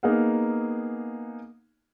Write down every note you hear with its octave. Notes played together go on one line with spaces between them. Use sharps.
A#3 B3 D#4 G#4 F5 F#5